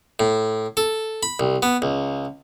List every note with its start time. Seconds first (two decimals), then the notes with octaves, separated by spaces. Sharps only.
0.20 A2
0.77 A4
1.23 B5
1.40 C2
1.63 B3
1.82 C#2